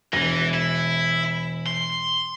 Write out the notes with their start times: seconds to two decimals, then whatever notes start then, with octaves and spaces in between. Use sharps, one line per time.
0.13 E1 E3 A#6
0.54 E4
1.67 C6